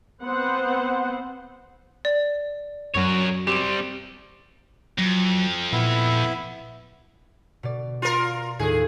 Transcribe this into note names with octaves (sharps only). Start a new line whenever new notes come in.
B3 C4 C5 F#5
D5
F#2 F#3 C#4 A#4 C#5
G3 C4 G4
F2 F#3
A#2 B3 E4 E5
B2 D5
F4 A#4
D#2 A2 F4 G#4